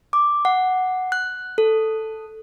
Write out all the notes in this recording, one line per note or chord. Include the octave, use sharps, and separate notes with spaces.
D6
F#5
F#6
A4